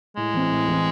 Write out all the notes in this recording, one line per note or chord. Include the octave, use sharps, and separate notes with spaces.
A2 G#3
E3 C4
A2
E3 C4